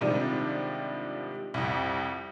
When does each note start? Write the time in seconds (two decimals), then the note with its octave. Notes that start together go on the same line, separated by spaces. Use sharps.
0.01 G#2 C3 D#3 F3 G3 D4
1.54 C2 F2